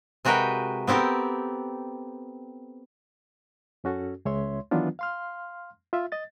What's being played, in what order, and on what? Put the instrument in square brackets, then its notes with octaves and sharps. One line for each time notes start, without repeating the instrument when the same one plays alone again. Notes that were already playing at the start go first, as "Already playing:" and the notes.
[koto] C3 G#3 F#4 A#4 B4 G5
B3 C4 G4 A4 A#4
[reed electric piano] F#2 C#4 F#4 A4
C#2 G#3 C#5 E5 C6
D#3 E3 F#3 B3 D4 F4
F5 C6 F6
F4 E5
D#5 A6